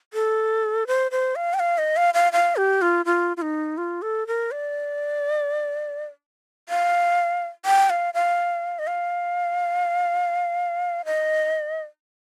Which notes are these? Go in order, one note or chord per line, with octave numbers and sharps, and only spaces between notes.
A4
C5
C5
F5
G5
F5
D#5
F5
F5
F5
G4
F4
F4
F4
D#4
F4
A4
A#4
D5
F5
G5
F5
F5
D#5
F5
D#5